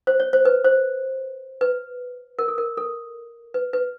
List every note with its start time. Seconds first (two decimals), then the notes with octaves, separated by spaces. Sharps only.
0.07 C5
0.20 C#5
0.33 C5
0.45 B4
0.65 C5
1.61 B4
2.39 A#4
2.48 A4
2.58 A#4
2.77 A4
3.54 B4
3.73 B4